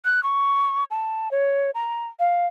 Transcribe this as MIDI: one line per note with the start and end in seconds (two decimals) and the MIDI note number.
0.05 0.23 90
0.23 0.84 85
0.91 1.31 81
1.31 1.71 73
1.75 2.08 82
2.20 2.47 77